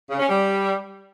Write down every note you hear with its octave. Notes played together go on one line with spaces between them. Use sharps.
C#3
C#4
G3